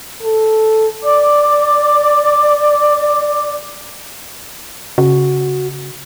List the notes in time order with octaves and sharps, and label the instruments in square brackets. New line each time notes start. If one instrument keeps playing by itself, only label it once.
[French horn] A4
[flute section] D5 D6
[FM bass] C#3 [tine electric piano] F#4